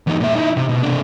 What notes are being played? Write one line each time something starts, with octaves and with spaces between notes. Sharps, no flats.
E2 D#4
A#2 E5
D#4 E4
C3
B2
C3 D4